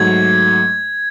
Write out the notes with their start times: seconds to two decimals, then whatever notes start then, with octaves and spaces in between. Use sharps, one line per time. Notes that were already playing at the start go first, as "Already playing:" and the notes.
Already playing: G#2 F#3 A3 G#6